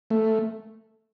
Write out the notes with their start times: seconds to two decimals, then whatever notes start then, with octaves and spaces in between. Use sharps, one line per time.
0.10 A3